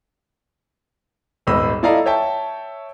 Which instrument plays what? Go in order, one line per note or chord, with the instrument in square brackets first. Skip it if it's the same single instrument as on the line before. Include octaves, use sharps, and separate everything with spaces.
[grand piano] D#1 G#1 B3 D#5 B5 E6
E4 A4 D5 D#5 F5 A#5
C#5 E5 G5 A5